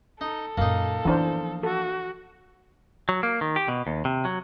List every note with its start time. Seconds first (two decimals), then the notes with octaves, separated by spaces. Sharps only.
0.21 D#4 A4
0.58 F#2 A#2 A#3 D#4
1.05 E3 F3 B3 D4 C5
1.63 F#4 A4
3.09 F#3
3.23 A#3
3.41 D#3
3.56 G4
3.68 B2
3.87 D#2
4.05 C3
4.25 F#3